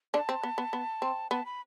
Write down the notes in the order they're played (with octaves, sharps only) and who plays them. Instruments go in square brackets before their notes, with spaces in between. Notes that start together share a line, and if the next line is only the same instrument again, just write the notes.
[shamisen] D3 D4 [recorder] A5
[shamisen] C4
B3
B3
B3
C4
[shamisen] B3 [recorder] A5
[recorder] B5